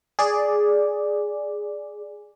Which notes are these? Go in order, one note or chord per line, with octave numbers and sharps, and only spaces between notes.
G#4 D5